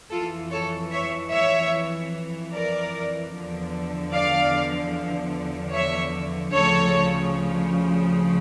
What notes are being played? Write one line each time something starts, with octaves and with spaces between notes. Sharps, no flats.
F2 E3 F4 A4
A4 C#5
C#5 E5
C#5 E5
A#4 D5
E2 D3 F3
D5 F5
C#5 E5
D2 C#3 F3 A4 C#5